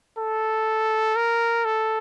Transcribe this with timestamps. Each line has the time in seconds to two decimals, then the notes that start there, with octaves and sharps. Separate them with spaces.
0.19 A4
1.16 A#4
1.65 A4